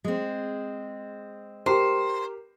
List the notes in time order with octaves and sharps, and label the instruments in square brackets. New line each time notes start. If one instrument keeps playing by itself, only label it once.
[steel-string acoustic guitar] G#3 C4
[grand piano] G4 A#4 [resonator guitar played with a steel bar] C5